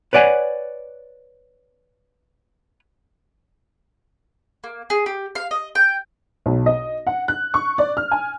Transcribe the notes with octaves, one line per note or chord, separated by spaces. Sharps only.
B4 C#5 D5 F#5 G#5
A#3
G#4
G4
F5
D#5
G5
B1
D#5
F#5
F#6
C#6
D5
F6
G#5